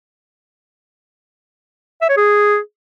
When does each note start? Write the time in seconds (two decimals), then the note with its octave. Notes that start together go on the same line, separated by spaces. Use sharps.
2.02 E5
2.09 C#5
2.17 G#4